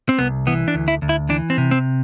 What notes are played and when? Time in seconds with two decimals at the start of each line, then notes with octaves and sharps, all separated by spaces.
0.09 C4
0.19 C2 B3
0.47 E3 B3
0.68 D4
0.75 D2
0.88 E4
1.02 D2
1.09 E4
1.29 E3 D4
1.50 C4
1.58 C3
1.71 C4